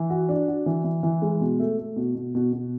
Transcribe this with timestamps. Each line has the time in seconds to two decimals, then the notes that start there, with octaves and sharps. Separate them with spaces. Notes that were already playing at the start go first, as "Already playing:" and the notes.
Already playing: E3
0.10 F#4
0.29 D4
0.48 F#4
0.66 E3
0.84 E3
1.03 E3
1.22 G#3
1.41 B2
1.59 A3
1.79 A3
1.96 B2
2.15 B2
2.35 B2
2.53 B2